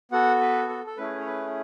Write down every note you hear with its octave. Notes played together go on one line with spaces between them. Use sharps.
B3 F#4 A4 F#5
B4
A4
A4
A3 C#4 E4 G#4 B4
C#5
B4